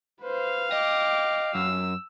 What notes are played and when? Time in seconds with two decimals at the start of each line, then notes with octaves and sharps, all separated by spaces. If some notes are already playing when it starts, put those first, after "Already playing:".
0.21 B4 C5 F5
0.72 D#5 G5 D6
1.55 F#2 E6